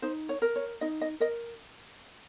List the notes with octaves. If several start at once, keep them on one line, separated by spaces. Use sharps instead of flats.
D#4 C5
C#5
A#4
C#5
D#4 D#5
D#5
A#4 D#5